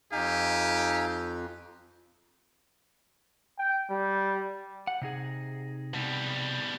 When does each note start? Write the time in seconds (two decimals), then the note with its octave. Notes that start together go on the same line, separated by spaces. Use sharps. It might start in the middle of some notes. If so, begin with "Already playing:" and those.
0.12 F2 D#4 G4 F5 G#5
3.59 G5
3.90 G3
4.87 F#5
5.01 C3 D#4 G#4
5.94 B2 G3